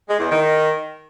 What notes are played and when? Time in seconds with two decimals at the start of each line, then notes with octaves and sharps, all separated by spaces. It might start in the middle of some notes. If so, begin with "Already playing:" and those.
0.08 G#3
0.20 E2
0.31 D#3